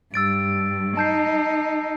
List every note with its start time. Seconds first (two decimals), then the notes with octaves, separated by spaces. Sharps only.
0.14 G2 E6 A6 D7
0.97 D#4 A5 G6 C7